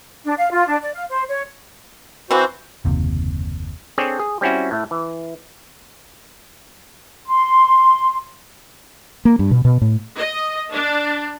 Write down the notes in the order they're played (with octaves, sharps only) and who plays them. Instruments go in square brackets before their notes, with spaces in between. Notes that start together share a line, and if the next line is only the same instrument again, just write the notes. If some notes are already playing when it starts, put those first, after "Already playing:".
[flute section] D4
F5
F4
D4
D5
F5
C5
C#5
[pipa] E3 C4 [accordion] F#4 C5
[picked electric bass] F#1 D#2 C3
[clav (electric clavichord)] C4 D4 G#4 A4 C#5 D5
G#4
G3 C4 C#4 E4 F#4
A2 A3
E3
[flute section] C6
[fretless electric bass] A#3
G2
B2
B2
A2
[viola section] D#5
D4